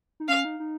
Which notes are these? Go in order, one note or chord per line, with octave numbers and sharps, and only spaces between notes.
D#4
C#4 F5
D#4
D#4